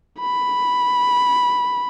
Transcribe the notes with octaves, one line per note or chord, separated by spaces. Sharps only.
B5